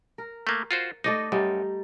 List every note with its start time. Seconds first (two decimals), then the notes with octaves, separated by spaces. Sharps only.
0.18 A#4
0.47 A3 A#3
0.71 F4 F#4 C5
1.04 A3 D#4 D5 D#5
1.32 F#2 G3 D#4